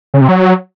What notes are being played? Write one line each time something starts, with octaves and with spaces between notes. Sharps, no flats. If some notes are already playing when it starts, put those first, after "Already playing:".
C#3
C3
F#3